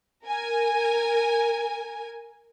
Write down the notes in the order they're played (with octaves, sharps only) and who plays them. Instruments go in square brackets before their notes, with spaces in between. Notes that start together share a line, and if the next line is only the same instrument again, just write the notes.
[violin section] A#4 G#5